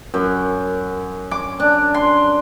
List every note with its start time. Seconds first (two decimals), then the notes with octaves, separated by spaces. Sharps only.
0.14 F#2
1.31 D6
1.60 D4
1.94 C6